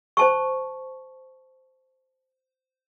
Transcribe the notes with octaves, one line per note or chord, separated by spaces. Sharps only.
C5 A5 C#6